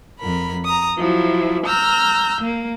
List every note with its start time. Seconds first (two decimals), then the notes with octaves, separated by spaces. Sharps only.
0.20 F2 A#4 B5
0.65 A#5 D#6
0.97 F3 F#3 E4
1.65 A#5 E6 F6 G6
2.40 A#3